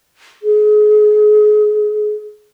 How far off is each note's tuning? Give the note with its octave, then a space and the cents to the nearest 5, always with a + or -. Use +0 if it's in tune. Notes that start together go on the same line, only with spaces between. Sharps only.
G#4 +30